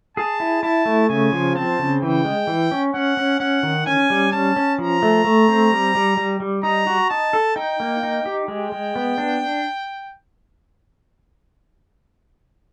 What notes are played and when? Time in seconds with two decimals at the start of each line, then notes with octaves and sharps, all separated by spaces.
0.17 G#4 A5
0.40 E4
0.63 E4 A5
0.86 A3
1.09 C#3 G#5
1.32 F3
1.55 C4 A5
1.79 C#3
2.02 E3 G5
2.25 G#3
2.47 E3
2.72 C#4
2.94 C#4 F#5
3.17 C#4
3.40 C#4 F#5
3.63 D#3
3.86 C#4 G#5
4.10 G3
4.32 C#4 A5
4.56 C#4
4.79 F3 A#5
5.03 A3
5.25 A3
5.48 C4
5.72 G3
5.95 G3
6.17 G3
6.40 G3
6.63 D#4 A#5
6.87 F#4
7.10 D#4 A5
7.33 A4
7.56 D#4 G5
7.80 A#3
8.03 D#4
8.26 G4
8.48 G#3 G5
8.72 G#3
8.96 B3
9.18 D4